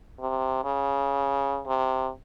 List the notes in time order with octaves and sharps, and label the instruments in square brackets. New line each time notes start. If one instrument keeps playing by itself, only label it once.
[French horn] C3
C#3
C3